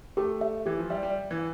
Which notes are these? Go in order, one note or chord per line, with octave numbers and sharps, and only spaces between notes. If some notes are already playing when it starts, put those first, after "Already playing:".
A3 G4
E5
E3 G4
F3
G3 E5
G3
D5
E3
F5